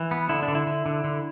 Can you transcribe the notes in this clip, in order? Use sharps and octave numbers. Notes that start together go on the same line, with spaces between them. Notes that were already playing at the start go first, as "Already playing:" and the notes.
Already playing: E3
B3
D3 E4
D4
D3
E4
D3
D3
D3